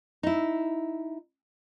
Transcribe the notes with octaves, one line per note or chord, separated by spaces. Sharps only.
D#4 E4